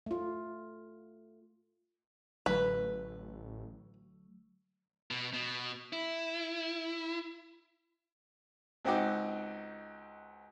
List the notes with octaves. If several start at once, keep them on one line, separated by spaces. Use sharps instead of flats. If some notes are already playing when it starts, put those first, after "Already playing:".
A3 F4
A1 D3 F#3 A3 B4
B2
B2
E4
C#2 C4 D#4 F#4 D6